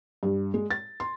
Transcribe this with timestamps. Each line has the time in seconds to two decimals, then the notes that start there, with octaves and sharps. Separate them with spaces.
0.23 G2
0.54 G#3
0.71 A6
1.00 C6